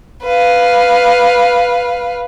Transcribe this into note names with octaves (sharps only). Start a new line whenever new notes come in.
B4 F5